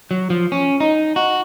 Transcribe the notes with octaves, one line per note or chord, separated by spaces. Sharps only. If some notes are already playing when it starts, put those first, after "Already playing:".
F#3
F3
C#4
D#4
F#4